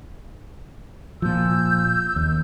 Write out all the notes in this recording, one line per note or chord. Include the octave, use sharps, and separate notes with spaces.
A#2 F3 E6 G6
D#2